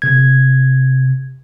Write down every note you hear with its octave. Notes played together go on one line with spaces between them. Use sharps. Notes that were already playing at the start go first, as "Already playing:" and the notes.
C3 G#6